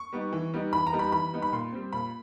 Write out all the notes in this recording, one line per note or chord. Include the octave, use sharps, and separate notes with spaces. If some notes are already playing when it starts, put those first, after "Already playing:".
Already playing: C#6
G3 B3 D#4
E3
G3 B3 D#4
E3 B5
A#5
G3 B3 D#4
B5
E3 B5
G3 B3 D#4
B5
A#2 C6
G3 C4
A#2 B5